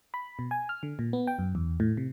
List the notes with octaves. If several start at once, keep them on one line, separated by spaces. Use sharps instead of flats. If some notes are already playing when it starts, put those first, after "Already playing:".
B5
B2
G#5
F6
D3
A#2
B3
G5
F#2
E2
A2
C3